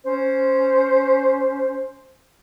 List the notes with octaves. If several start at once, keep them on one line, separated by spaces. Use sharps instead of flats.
C#4 C5